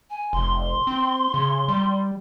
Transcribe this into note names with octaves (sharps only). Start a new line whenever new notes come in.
G#5
F1 C6
C4
C#3
G3